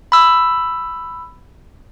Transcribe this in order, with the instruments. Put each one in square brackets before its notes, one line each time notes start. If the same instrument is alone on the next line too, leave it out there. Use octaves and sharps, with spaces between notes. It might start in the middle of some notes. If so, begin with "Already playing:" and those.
[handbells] B5 E6